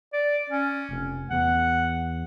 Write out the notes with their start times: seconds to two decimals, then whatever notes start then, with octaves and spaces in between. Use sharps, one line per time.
0.13 D5
0.50 C#4
0.89 F1
1.30 E2 F#5